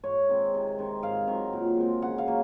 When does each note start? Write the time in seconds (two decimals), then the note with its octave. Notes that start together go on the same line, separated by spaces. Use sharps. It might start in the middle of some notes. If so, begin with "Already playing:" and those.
0.03 G#2 C#5
0.29 D#3 G#3 C4
0.54 C3
0.78 D#3 G#3 C4
1.03 G#2 F5
1.28 D#3 F#3 C4
1.53 A#2
1.77 G#3 C4
2.02 C#3 F#5
2.18 F5
2.27 F#3 A#3